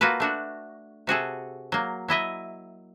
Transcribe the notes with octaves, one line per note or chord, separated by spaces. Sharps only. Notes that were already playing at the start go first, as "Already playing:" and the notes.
A#3 F4 F#4 A4 B4
A3 D4 F#4
C3 F#4 G#4 A4
F#3 A#3
F#3 E4 D#5 E5